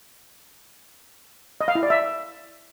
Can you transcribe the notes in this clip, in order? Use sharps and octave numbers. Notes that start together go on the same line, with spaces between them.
D#5
F5
E4
D5
E5